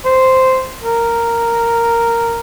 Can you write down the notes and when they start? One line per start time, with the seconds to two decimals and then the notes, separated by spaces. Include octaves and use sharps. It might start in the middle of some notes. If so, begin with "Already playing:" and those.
0.05 C5
0.84 A#4